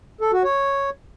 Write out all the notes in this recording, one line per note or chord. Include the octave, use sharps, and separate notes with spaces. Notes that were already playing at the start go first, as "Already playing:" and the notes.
A4
F#4
C#5